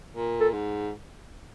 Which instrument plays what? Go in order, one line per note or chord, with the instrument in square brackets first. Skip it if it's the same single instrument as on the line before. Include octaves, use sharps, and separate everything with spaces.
[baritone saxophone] A#2
[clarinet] A4
[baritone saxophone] G#2